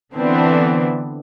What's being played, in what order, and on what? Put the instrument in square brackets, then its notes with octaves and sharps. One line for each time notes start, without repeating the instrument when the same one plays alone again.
[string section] D3 E3 B3 C4 D4